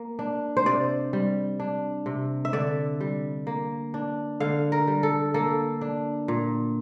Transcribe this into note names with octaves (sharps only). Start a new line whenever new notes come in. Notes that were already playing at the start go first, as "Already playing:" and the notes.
Already playing: A#3
D4
C5
C3 D5
G3
D4
C3
E5
D3 D5
G3
A#3
D4
D3 F5
A#4
G3
A4
A#3 A4
D4
A#2